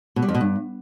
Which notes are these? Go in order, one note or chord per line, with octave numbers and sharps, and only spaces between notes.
B2
G3
F2
B2
G2